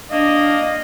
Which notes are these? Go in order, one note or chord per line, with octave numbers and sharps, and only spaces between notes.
A#3 D4 D#5 F5